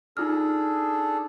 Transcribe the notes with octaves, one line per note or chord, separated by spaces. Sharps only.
D4 D#4 F4 G#4 A4 F6